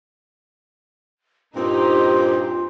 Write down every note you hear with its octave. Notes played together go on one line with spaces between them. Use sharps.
G2 A#2 C4 D#4 F4 G4